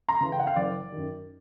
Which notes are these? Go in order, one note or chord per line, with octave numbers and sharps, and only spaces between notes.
A#5 C6
C#3 E3
G5
F#5
F5 G5
F#1 D5
F#2 D#3